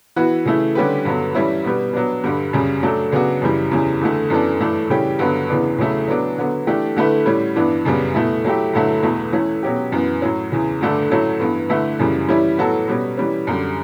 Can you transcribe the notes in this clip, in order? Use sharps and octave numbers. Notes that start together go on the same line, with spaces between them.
E3 B3 F#4 B4
C#3 E3 A3 E4
D3 G3 C#4 G4 B4
G2 D3 F#3 B3
E3 G3 C#4 E4
B2 G3 B3
F#3 B3 D4
G2 D3 G3
F#2 C#3 G3
F#3 A3 D4 A4
C#3 F#3 B3 D4 F#4
F#2 C#3 E3 G3
E2 C#3 E3 G3 C#4
E2 D3 A3
F#2 E3 B3 D4 A4
G2 E3 A3 D4
C#3 E3 G3 C#4 G4
G2 D3 F#3 B3
E2 C#3 E3 B3 D4
E2 C#3 F#3 A3 E4
F#3 B3 D4
D3 F#3 B3
E3 A3 D4 G4
D3 A3 E4 B4
A2 G3 C#4
G2 E3 B3 D4
F#2 C#3 G3 B3
B2 A3 E4
F#3 A3 E4 G4
G2 D3 F#3 A3 E4
E2 B2 A3
E3 A3 C#4
B2 F#3 C#4 G4
F#2 E3 B3
A2 F#3 C#4
E2 C#3 E3
G2 D3 A3 D4 A4
A2 F#3 A3 C#4
G2 E3 B3
D3 A3 E4 B4
F#2 C#3 E3 G3
E3 G3 C#4 E4
A2 F#3 B3 F#4 A4
B2 G3 C#4
E3 G3 C#4
F#2 D3 G3